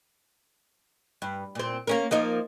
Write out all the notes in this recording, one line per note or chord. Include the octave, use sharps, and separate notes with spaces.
G2
A#2 C4
A#3 C#4 A#4
F3 A#3 D#4